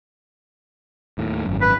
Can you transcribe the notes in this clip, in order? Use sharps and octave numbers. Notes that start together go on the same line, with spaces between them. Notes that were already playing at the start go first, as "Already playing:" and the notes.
D#2 A2
G#1 F#2
B4